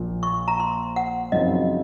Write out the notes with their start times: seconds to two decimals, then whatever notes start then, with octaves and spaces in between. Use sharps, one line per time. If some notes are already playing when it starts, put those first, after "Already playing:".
Already playing: A#1 A#2 F3
0.23 C#6
0.48 A#5
0.60 C6
0.96 F#5
1.32 F#2 C#3 F3 C4 D#4 D#5